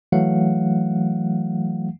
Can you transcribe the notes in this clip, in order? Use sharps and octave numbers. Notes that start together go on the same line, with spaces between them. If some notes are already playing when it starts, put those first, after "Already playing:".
E3 F#3 A3 F5 F#5